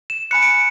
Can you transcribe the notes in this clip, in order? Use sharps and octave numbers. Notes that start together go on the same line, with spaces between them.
E7
G#5 B5 F#6 C#7
D7
C#7